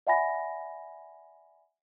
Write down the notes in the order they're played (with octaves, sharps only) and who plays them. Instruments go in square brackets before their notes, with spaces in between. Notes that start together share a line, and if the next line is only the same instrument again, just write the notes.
[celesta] D5 E5 F#5 G#5 B5 A#6